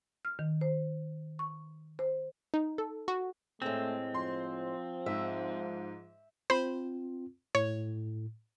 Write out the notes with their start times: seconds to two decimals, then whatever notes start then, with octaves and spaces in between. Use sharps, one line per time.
0.25 F6
0.39 D#3
0.61 C5
1.39 C#6
1.99 C5
2.54 D#4
2.78 A4
3.08 F#4
3.62 A2 G#3 A3 C4
4.14 F3 C6
5.06 G#2 E5
6.50 C4 F4 C5 B5
7.55 A2 C#5